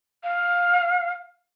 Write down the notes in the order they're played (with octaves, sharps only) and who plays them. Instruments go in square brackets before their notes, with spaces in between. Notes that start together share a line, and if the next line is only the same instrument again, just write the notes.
[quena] F5